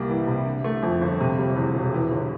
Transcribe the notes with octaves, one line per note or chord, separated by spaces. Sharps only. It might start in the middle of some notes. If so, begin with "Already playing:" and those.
Already playing: C2 G3 A#3
E3
C3
D3
A3
F2
G1
C3
G3
E2
E1
E3
G1